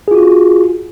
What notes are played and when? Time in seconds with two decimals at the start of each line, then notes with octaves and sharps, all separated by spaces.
0.08 G#4
0.11 F4
0.15 F#4